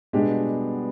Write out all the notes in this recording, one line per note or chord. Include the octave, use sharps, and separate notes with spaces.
B2 G3 G#3 B3 D4 G4